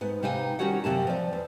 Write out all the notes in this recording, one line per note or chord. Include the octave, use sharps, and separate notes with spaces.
G#2 B3
C3 B3 D#4 F5 G5 G#5
D#3 G3 C#4 F#4 C#5 F#5
F#2 C3 A#3 A5
F3 D5
E2